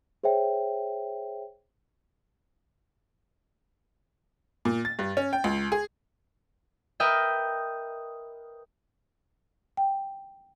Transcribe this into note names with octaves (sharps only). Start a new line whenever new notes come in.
G#4 C5 C#5 E5 G5
A#2
A6
G2
C#4
G5
C#2
G#4
A#4 B4 D#5 E5 G5
G5